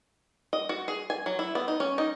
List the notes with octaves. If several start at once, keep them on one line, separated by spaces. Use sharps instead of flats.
D#5
F#4
G#4
G#5
F#3
E4
B3
D#4
C#4
D#4